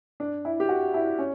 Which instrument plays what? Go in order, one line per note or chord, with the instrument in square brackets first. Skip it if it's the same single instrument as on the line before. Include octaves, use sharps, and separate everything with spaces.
[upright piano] D4
E4
G4
F#4
E4
C#4